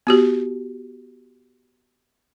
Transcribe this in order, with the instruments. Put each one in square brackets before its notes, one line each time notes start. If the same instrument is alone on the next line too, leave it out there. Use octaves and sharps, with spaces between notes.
[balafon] B3 F#4 G4